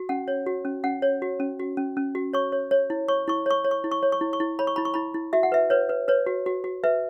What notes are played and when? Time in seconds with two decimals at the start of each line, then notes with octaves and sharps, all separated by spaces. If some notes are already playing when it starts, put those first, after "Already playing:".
Already playing: F#4
0.09 C#4 F#5
0.28 C#5
0.46 F#4
0.65 C#4
0.84 C#4 F#5
1.02 C#5
1.22 F#4
1.40 C#4
1.60 F#4
1.77 C#4
1.97 C#4
2.15 F#4
2.33 C#5 C#6
2.52 C#5
2.71 C#5
2.90 E4
3.08 C#5 C#6
3.28 E4 C#6
3.46 C#5 C#6
3.64 C#5
3.71 C#6
3.84 E4
3.92 C#6
4.03 C#5
4.12 C#6
4.21 E4
4.33 C#6
4.40 E4
4.59 C#5 B5
4.67 C#6
4.76 E4 B5
4.85 C#6
4.94 E4 B5
5.14 E4
5.33 F#4 E5
5.43 F#5
5.52 B4 E5
5.70 B4 C#5
5.89 B4
6.08 B4 C#5
6.26 F#4
6.46 F#4
6.64 F#4
6.84 B4 E5